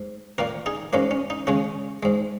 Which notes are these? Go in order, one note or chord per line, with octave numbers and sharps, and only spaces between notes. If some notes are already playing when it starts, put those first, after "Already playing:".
Already playing: G#2
A#2 A#3 F#4 A#4
D#4 G#4
G#2 F#3 A#3 C#4 F#4
C#4
D#4
C#3 G#3 C#4 F#4
G#2 G#3